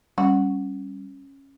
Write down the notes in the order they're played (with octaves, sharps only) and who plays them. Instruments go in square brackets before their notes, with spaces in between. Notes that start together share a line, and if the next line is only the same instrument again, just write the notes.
[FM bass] G3 [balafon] C#4 [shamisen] F#4